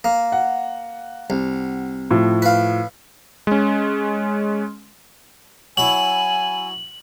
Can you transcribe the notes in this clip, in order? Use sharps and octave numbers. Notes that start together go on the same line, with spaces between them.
A#3
F#5
C2
A2 F3
B4 F5
G#3 C#4
F#3 E4 G#5 F#7